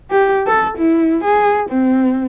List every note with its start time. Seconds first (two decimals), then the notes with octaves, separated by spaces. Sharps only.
0.11 G4
0.47 A4
0.78 E4
1.24 G#4
1.70 C4